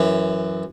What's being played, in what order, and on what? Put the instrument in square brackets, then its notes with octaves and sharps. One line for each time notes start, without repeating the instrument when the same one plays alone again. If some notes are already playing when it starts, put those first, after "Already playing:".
Already playing: [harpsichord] F#2 E3